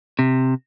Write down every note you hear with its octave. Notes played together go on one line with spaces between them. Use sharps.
C3